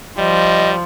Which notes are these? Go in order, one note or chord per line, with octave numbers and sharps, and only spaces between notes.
F3 G3 D#5